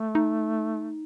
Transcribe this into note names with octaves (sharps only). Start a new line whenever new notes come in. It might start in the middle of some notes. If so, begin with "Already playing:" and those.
Already playing: A3
D#4